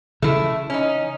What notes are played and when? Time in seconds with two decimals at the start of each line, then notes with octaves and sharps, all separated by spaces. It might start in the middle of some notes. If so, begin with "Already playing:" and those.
0.22 C#3 E3 A3 E4
0.70 C#4 D#4